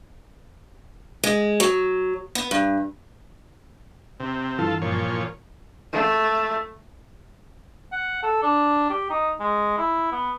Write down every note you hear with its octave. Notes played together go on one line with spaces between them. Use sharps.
G#3
F#3
B3
G2
C3
G2 E3 F4 A4
A#2 F3 C#5
A3
F#5
A4
D4
G4
D#4
G#3
E4
B3